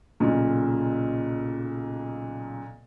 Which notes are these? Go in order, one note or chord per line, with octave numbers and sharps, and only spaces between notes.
B1 A#2 C#3